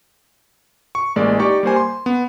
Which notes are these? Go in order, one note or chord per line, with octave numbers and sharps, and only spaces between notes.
C#6
A1 G#3 A#3 D5
D#4 G4 D5 C#6
G3 A#3 C5 G#5
C6
B3